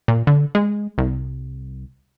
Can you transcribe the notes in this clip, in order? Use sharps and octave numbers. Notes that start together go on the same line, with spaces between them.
A#2
D3
G#3
C2